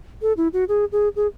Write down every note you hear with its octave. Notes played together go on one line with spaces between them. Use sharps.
A4
E4
F#4
G#4
G#4
G#4